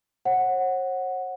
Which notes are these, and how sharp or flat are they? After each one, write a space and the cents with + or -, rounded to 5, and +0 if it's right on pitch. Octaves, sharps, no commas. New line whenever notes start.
C#5 -45 F#5 +0